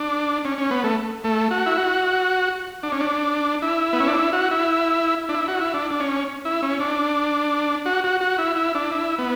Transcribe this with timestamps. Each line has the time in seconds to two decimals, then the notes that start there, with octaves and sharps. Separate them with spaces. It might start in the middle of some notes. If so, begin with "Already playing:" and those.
Already playing: D4
0.45 C#4
0.58 C#4
0.71 B3
0.84 A3
1.24 A3
1.51 F#4
1.66 E4
1.77 F#4
2.83 D4
2.92 C#4
3.00 D4
3.62 E4
3.93 B3
4.00 C#4
4.08 D4
4.14 E4
4.33 F#4
4.51 E4
5.29 D4
5.34 E4
5.48 F#4
5.61 E4
5.74 D4
5.91 D4
6.00 C#4
6.45 E4
6.62 C#4
6.80 D4
7.86 F#4
8.04 F#4
8.21 F#4
8.38 E4
8.56 E4
8.75 D4
8.91 E4
9.19 B3